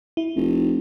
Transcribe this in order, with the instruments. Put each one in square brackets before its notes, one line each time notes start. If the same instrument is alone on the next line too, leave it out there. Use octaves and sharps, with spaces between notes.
[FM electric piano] E4
[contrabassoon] F1